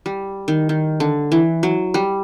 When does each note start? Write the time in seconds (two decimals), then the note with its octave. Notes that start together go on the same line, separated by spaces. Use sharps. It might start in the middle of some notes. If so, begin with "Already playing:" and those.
0.06 G3
0.48 D#3
0.69 D#3
1.00 D3
1.32 E3
1.63 F#3
1.94 G3